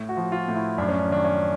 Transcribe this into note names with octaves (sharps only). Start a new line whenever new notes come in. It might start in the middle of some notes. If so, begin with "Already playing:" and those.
Already playing: A2
F#4
F3
F4
A2
E4
F#2 D4
C#4
D4
D#3 D4
C#4